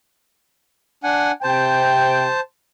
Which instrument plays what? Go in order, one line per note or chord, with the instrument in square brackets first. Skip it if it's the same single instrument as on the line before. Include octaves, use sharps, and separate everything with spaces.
[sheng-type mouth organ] D4 F#5 G#5
[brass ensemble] C3 G5 [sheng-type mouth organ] C5 A5